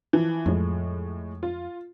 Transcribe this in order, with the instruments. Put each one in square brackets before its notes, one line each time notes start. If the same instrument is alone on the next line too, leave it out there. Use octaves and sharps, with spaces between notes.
[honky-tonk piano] E3 F3
[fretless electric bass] F2 [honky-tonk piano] A2 G#3
[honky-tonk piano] F4